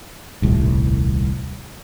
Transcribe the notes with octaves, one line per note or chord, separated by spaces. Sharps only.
D#1 C2 A2